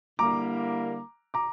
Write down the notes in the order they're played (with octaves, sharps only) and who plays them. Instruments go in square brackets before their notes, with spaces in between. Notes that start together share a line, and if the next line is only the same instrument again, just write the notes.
[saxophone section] D3 G3 A#3 E4 [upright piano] A#5 D6
[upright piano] A#5 D6